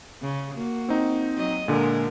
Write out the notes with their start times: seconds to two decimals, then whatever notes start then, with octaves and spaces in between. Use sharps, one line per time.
0.22 C#3
0.55 A#3 F#4
0.89 C4 D#4
1.37 F#3 D#5
1.68 A#2 D3 G#3 A#4